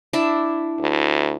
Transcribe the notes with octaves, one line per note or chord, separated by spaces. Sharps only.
D4 E4 E5
D2